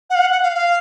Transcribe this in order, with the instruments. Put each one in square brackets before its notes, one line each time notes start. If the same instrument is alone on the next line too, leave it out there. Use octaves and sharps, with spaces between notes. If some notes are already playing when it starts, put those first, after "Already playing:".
[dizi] F#5
F5
F#5
F#5
F5
F5